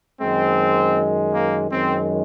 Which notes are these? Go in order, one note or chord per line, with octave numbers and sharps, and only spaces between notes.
F#2 D#3 G#3 C4
A#3
F#2 D#3 G#3 C4